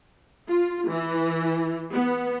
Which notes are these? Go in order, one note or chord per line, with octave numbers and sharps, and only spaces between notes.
F4
E3
B3